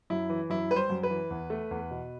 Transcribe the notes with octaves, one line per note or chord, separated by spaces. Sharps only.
F#2 E4
E3
F#2 E4
G3 B4
C5
F#2
B4
E3
E2
A3
E2
B2